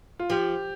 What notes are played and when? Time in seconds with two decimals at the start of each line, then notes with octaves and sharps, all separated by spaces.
0.19 F4
0.30 F3 G4